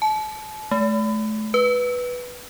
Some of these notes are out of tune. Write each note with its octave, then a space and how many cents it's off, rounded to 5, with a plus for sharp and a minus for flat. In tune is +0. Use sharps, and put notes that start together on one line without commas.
A5 -35
A3 -30
B4 -5